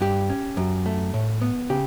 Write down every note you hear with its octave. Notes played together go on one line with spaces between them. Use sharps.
G2 G4
C#4
F#2
A3
A2
B3
C#3 G4